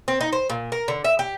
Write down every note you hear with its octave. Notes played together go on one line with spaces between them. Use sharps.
C4
D#4
C5
A#2
A#4
D3
E5
G4